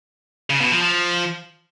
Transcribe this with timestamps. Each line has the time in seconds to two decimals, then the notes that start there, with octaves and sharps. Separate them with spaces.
0.50 C#3
0.61 B2
0.71 F3
0.82 F3